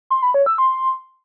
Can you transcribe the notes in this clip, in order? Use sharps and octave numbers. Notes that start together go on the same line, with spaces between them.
C6
B5
C#5
E6
C6